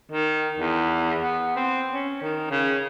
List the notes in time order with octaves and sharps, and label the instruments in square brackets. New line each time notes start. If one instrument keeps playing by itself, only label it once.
[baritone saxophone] D#3
E2
B3
C4
C#4
D#3
C#3